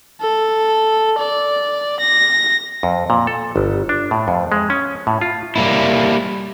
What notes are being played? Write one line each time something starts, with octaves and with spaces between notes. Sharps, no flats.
A4
D5
A#6
F2
A#2
A4
G1
D4
A2
F2
G#3
C#4
A2
F4
G3 A#3 E4